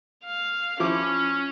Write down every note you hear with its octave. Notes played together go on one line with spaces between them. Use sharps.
F5
F3 C#4 E4 D6